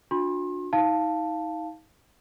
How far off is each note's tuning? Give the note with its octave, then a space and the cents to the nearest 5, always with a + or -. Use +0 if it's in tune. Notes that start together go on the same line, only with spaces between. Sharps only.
D4 +0 F#4 -45 C6 +40
D#4 +35 F5 +0 A5 +0